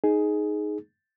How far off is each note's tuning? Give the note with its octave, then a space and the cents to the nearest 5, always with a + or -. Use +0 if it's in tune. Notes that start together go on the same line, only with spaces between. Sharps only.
D#4 +0 G#4 +10